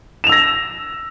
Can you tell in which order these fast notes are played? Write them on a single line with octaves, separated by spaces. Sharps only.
E7 F7 E6 A#6